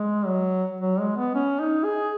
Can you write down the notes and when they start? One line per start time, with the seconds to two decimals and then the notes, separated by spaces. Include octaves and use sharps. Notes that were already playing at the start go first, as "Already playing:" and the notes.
Already playing: G#3
0.26 F#3
0.81 F#3
1.00 G#3
1.17 B3
1.35 C#4
1.60 D#4
1.84 G#4